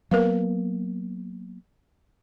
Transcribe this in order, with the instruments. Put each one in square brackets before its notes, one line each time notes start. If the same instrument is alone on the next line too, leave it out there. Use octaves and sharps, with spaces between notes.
[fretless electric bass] F#3 A#3 B3 [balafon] A#4 B4 F5